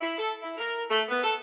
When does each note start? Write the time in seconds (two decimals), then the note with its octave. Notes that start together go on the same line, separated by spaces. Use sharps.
0.01 E4
0.17 A4
0.41 E4
0.58 A#4
0.90 A3
1.08 B3
1.22 A4